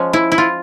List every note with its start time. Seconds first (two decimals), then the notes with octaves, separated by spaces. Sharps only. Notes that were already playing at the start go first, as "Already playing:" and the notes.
Already playing: F3 G#3 C#4
0.13 E4
0.32 E4
0.38 F4